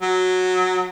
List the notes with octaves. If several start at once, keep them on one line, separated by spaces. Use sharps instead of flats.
F#3